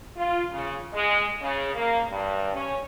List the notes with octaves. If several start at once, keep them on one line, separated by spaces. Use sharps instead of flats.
F4
C#3
G#3
C#3
A#3
G2
C#4